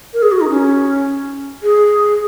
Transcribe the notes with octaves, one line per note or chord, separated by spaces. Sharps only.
A#4
G#4
F#4
D#4
C#4
G#4